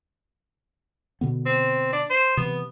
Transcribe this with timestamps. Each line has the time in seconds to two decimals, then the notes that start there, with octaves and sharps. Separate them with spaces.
1.21 B2 D3 B3
1.46 C4
1.93 D4
2.10 C5
2.37 C3 E3 B3